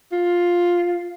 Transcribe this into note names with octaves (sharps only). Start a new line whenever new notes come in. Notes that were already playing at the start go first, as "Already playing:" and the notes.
F4